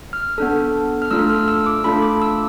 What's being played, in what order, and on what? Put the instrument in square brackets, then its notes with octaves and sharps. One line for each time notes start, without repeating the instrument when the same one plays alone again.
[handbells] F6
B3 D4 A4
F6
A3 D4 F4 A4 E6
F6
E6
D6
A3 D4 F4 A4 B5
D6
E6